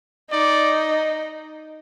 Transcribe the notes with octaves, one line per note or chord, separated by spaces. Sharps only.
D#4 D5